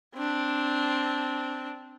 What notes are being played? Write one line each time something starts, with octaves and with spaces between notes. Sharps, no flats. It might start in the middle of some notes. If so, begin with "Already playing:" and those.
C4 D4